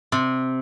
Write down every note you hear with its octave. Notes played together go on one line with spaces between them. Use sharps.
C3